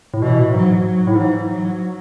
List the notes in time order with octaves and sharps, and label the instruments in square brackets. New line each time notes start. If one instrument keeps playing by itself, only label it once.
[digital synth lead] A2
[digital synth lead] B2 [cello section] E3
[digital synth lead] B2
A2
[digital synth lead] G#2 [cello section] F#3
[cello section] F#3
[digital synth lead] A2
[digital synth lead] G#2 [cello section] E3
[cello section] F#3